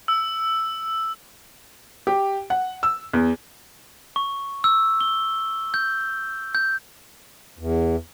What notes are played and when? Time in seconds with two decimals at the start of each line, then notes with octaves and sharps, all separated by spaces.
0.08 E6
2.07 G4
2.50 F#5
2.83 E6
3.13 E2
4.16 C#6
4.64 E6
5.01 G7
5.74 G6
6.55 G6
7.59 E2